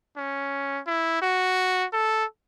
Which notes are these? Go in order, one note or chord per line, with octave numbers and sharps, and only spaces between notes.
C#4
E4
F#4
A4